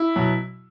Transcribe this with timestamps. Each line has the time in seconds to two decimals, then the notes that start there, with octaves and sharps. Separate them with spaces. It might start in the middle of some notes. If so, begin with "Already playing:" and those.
Already playing: E4
0.16 B2 F#3